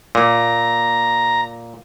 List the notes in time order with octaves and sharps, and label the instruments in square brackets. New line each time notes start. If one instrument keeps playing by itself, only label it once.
[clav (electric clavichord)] A#2 [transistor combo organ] A#5